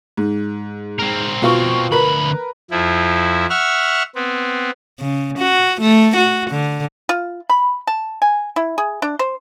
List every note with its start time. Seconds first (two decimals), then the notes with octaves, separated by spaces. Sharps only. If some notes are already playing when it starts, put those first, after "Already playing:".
0.17 G#2
1.00 C4 A#4
1.42 B2 F4 C#6
1.92 D2 A#4 B4 B5
2.71 F2 F3 E4
3.50 E5 F#5 C#6 F6
4.15 B3 C4
5.00 C#3
5.39 F#4
5.81 A3
6.17 F#4
6.51 D3
7.09 F4
7.50 B5
7.87 A5
8.22 G#5
8.56 E4
8.78 G#4
9.02 D4
9.19 C5